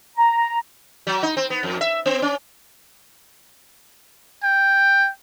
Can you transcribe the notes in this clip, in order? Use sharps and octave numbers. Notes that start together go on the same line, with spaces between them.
A#5
F#3
D#4
C4
B3
F2
E5
B3
C#4
G5